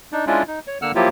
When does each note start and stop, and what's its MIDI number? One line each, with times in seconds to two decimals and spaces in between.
0.12 0.25 62
0.12 0.25 63
0.27 0.43 56
0.27 0.43 61
0.27 0.43 62
0.27 0.43 64
0.27 0.43 65
0.48 0.60 63
0.67 0.78 73
0.82 0.92 50
0.82 0.92 58
0.82 0.92 78
0.82 0.92 88
0.82 0.92 89
0.95 1.09 53
0.95 1.09 54
0.95 1.09 58
0.95 1.09 64
0.95 1.09 65
0.95 1.09 67